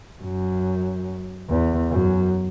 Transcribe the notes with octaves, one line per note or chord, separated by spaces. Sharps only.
F#2
E2
F#2